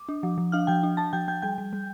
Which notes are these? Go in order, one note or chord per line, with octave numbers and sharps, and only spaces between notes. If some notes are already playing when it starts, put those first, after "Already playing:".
Already playing: D6
D4
F3
F3
D4 F5 F6
F3 G5 G6
D4
D4 A5 A6
F3 G5 G6
F3 G5 G6
G3 G5 G6
G3
G3